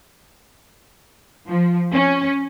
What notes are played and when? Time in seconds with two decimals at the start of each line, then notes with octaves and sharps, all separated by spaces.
1.50 F3
1.94 C#4